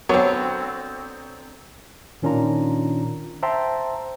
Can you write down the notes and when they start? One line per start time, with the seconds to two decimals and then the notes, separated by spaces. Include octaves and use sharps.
0.09 D3 F#3 B3 C4 C#5
2.22 A#2 D#3 C#4 D4 F4 A#5
3.43 C5 E5 G5 A5 A#5 C6